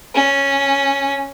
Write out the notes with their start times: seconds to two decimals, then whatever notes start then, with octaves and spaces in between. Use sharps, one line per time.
0.15 C#4